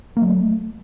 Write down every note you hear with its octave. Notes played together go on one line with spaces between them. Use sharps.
F#3 A3 A#3